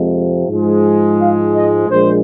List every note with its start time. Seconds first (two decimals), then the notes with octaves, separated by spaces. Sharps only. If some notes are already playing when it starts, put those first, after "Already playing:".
Already playing: F2 C3 F3 G#3
0.48 G#2 F3 G#3
1.19 F5
1.53 D#5
1.89 A#1 A#2 G#3 C5